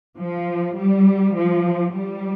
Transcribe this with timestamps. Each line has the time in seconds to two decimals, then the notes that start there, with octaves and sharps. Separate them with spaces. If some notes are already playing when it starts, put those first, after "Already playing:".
0.19 F3
0.77 G3
1.37 F3
1.95 G3